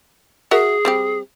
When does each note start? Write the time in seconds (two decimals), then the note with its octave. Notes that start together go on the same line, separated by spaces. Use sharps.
0.51 F#4 G#4 A#4 E5
0.85 G3 C4 G4